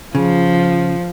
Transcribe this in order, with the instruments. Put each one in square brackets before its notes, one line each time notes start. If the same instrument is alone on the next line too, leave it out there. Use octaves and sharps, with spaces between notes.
[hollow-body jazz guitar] C#3 [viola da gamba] F3